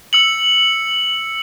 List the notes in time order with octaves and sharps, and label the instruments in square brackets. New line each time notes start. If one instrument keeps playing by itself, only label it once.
[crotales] E6 C#7 F#7